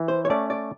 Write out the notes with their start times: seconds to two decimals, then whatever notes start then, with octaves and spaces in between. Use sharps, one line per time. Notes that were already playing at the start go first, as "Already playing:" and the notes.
Already playing: E3
0.08 C5
0.25 C#5
0.30 A3 C#4 D5
0.50 D5